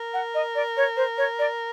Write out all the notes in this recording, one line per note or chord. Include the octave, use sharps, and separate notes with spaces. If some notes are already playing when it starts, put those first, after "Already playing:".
Already playing: A#4
F#5
D#5
D5
C#5
C5
C#5
D5